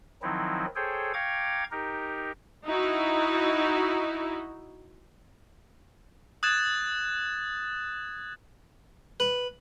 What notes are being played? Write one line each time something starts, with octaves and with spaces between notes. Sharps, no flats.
D#3 F3 F#3 C4 D#4 E4
G#4 A4 C5 C#5 G5
F5 G5 A#5 C#6 D6 G#6
D#4 G4 A#4
D#4 E4 F#4
D#6 F#6 G#6 A6 E7
B4